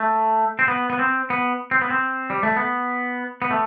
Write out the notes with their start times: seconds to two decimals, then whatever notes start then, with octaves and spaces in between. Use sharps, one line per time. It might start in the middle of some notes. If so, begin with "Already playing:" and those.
Already playing: A3
0.59 C4
0.68 B3
0.90 B3
0.99 C4
1.30 B3
1.71 C4
1.81 B3
1.90 C4
2.30 G3
2.43 A3
2.56 B3
3.42 B3
3.51 A3